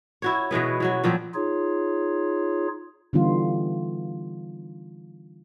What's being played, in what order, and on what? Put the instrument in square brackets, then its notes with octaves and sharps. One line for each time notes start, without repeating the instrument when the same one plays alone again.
[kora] E4 F#4 C#5
B2 E3 G#3 B3
E3 F#3 F#4
A#2 F3 F#3 C4
[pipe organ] D#4 F4 G#4 C#5
[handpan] D3 E3 G3 B3 D#4 F4